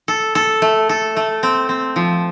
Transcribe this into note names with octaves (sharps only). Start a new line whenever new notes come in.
A4
A4
A3
A4
A3
C4
C4
F3